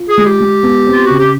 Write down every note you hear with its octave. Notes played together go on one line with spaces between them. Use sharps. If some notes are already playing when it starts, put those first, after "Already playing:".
Already playing: F4
G#4
G#3
G4
G#3
B3
C4
F4
C#3 F#4
G4